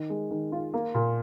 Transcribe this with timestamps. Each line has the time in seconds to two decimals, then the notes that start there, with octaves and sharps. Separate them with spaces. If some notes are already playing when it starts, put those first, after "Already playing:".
Already playing: D#3
0.10 G#3
0.31 D#3
0.52 F4
0.74 A#3
0.95 A#2